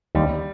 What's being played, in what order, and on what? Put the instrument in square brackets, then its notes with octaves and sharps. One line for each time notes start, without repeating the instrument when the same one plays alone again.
[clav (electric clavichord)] D#2 [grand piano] G3